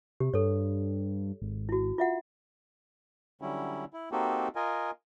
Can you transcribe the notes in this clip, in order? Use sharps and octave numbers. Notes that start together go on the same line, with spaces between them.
C3 G4
G2 A4 C#5
G#1
E4 F#4
F4 E5 F#5
D3 F#3 G3 C#4 E4
E4
A#3 C4 D#4 F#4 G4 A4
F4 A#4 D#5 G#5